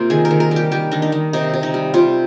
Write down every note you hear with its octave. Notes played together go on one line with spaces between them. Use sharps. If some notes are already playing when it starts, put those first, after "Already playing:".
Already playing: C3 A#3 F4
D#3 G#4
A#4
D#3
A#4
G3 G4
D#3 G4
D#3 D4
D#4
D#3
C3 D#4
C3
D#4
G3
C3 F4